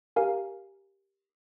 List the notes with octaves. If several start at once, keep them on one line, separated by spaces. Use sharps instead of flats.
G4 A#4 F5 G#5